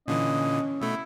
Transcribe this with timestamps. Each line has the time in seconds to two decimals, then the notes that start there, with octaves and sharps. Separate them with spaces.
0.08 A#2 D3 E3 C#4 D#5
0.81 B2 A3 E4